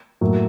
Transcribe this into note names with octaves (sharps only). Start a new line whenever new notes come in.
A2 F#3 A#3